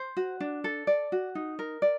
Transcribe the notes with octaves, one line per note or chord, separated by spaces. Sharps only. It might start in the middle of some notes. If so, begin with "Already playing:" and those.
Already playing: C5
F#4
D4
A4
D5
F#4
D#4
A#4
D5